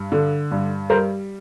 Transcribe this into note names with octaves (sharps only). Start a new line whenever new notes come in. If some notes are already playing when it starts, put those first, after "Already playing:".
Already playing: G2
D3
G2
G3 A#4 C5